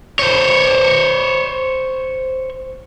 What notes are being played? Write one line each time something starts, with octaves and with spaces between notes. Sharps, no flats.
C5 C#5